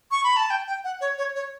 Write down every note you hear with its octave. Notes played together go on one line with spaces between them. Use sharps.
C#6
B5
A5
G5
G5
F#5
C#5
C#5
C#5